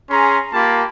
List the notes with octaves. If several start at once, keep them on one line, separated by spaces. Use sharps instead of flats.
C#4 G#4 A#5 C6
A#3 F4 G4 A5 B5